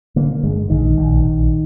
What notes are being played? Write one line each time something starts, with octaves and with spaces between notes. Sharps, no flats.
D3 A#3
G1 G#3
A#1 D#3
A#1
A#1